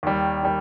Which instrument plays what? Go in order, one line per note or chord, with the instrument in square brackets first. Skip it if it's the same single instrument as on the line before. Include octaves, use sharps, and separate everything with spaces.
[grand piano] D#2 D#3 G3
D#3 G3